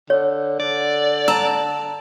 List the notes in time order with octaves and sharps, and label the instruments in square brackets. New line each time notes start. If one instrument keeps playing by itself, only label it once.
[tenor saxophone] D3 [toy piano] C#5
[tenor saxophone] D3 [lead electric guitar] D5
[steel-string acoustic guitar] A5 A#5 [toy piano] E6